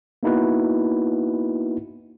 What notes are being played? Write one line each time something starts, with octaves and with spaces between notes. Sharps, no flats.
A#3 B3 D#4 E4 F#4 B4